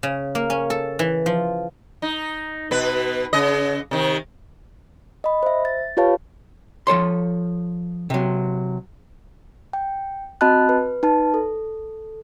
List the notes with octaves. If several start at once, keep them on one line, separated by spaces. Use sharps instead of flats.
C#3
A#3
C#4
A4
E3
F3
D#4
B2 B4
C#3 D#5
C3 D#3
D#5 B5
C5 E5
A6
F4 G4 B4 C#5 F5 A5
F3 A4 C#5 C6
C3 F#3
G5
C4 F#4 D#5 A5 B5 F#6
B4
D#4 B4 A5
A4